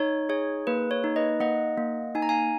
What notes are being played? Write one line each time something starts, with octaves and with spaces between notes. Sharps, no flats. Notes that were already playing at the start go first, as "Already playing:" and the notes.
Already playing: D#4 C#5
G#4 C#5
A#3 B4
C#5
D#4
B4 D#5
A#3 D#5 F#5
A#3
D#4 G#5
A#5
F5 G#5